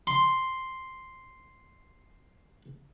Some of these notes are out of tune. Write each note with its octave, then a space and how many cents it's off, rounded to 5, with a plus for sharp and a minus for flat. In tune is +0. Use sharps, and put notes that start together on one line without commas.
C6 +0